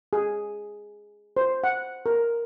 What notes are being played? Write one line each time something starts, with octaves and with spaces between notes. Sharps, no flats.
G#4
C5
F#5
A#4